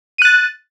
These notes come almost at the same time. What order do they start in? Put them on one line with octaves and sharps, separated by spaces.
D#7 F#6 A6